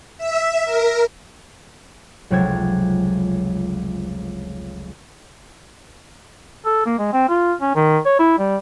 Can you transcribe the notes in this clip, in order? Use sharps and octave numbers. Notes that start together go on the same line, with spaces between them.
E5
A#4
F1 C#2 F#3 G5 G#6 A6
A4
A#3
G#3
C4
F4
C#4
D#3
C#5
E4
G3